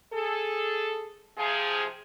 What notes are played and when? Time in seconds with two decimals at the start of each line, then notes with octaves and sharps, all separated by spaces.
0.13 G#4 A4
1.38 C3 F3 G#4